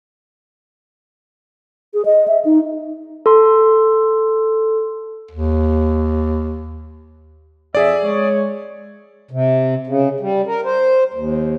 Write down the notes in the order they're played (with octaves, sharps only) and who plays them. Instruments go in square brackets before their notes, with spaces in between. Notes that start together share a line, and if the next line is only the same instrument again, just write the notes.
[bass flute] G#4
D#5
E5
D#4
[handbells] A4 C6
[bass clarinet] D#2
[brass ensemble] F2 E5 [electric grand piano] G#4 D5
[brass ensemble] G#3 C#5
[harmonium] C3
C#3
G3
A#4
C5
D#2